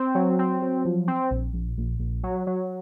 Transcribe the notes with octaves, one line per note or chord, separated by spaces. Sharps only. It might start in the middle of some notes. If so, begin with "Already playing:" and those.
Already playing: C4
F#3
C4
F#3
F3
C4
A#1
A#1
A#1
A#1
F#3
F#3